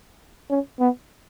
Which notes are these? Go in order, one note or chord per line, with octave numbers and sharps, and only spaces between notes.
C#4
B3